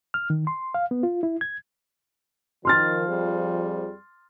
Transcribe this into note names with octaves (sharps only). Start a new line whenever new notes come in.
F6
D#3
C6
F5
B3
F4
E4
G#6
D#3 F3 C6 F6 A6
F2 G3 G#4